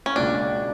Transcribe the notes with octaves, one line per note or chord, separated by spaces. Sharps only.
C#4
C#2 B2 F#3 A#3 D4